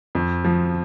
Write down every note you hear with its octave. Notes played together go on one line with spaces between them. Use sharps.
F2
F3